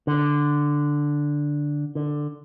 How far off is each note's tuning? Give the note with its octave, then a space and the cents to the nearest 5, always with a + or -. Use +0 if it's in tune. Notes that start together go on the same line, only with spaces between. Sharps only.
D3 +0
D3 +10